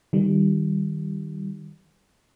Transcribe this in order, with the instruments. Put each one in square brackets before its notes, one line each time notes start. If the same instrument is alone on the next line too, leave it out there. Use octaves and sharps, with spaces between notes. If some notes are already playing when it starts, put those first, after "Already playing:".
[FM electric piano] D#3 G3